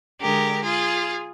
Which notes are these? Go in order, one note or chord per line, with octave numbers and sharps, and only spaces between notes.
D3 G#3 G4 A#4
F4 G#4